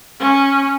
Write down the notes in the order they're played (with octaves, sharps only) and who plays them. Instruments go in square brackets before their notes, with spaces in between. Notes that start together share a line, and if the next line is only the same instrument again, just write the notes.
[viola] C#4